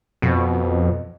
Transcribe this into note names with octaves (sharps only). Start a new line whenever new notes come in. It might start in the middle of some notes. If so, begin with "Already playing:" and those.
F2 B2